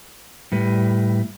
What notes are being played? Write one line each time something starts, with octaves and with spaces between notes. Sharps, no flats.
A2 G3 B4